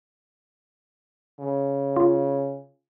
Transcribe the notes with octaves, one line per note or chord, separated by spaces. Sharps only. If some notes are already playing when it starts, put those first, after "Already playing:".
C#3
F4